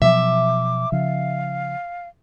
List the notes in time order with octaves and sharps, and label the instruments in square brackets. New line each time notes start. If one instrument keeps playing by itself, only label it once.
[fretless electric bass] B2 F3 F#3 [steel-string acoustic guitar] E5 [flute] D6
[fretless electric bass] C#3 F3 [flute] F5